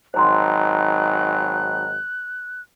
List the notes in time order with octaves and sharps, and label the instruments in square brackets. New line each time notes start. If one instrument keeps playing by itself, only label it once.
[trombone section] G#1 F#3 D#4 [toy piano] C5 A#5 C6 [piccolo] F#6